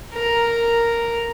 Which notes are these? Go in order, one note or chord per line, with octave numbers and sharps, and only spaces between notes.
A#4